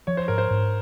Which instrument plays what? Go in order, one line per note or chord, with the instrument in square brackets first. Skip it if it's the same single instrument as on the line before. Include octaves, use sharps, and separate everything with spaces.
[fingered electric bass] F3 [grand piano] C#5
[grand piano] C5
[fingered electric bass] G#2 [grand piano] A#4
[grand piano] C5
[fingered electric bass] G#2